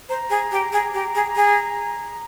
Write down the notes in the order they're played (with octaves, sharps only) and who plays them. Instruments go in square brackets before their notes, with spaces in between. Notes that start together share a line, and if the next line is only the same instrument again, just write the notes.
[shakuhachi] C5 [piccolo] A#5
[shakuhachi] G#4
G4
G#4
G4
G#4
G#4